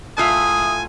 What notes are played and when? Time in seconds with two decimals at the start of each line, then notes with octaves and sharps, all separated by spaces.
0.18 A2 F4 E5 G#5 D#6